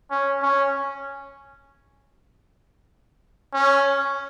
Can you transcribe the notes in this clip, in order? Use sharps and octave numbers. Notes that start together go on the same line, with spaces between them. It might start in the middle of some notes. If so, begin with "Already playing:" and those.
C#4
C#4
C#4